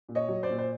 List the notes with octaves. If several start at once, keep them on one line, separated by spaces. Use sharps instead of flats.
A#2
C#5 D#5
F#3
C5 D5
A#2
C5